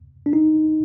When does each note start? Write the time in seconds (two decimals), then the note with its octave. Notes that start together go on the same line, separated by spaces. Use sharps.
0.26 D4
0.33 D#4